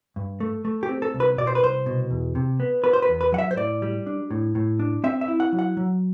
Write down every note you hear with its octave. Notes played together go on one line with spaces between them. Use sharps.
G2
A3
A3
G4
C4
A4
C2
B4
B2 D5
C5
B4
C2 C5
B2
E2
C3
B3
B3 B4
C5
B4
E2
B4
F#3 F#5
E5
C5
A2 D5
G3
D4
A2
A2
D4
C4 E5
E5
E4
F#5
F#3
F#5
F#3